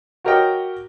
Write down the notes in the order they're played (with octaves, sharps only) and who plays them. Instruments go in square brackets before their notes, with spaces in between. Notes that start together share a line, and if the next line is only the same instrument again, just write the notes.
[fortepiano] F#4 G4 A#4 C#5 D#5 G5